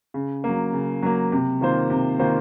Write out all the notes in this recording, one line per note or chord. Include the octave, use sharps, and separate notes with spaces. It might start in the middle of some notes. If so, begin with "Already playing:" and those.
C#3
F#3 A#3
C#3
F#3 A#3
C3
D#3 A#3 F4 C5
C3
D#3 A#3 F4 C5